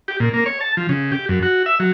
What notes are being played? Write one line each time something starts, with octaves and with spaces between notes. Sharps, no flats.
G4
A#2
A#3
C#5
A5
F3
C#3
G4
F#2
F#4
E5
F#3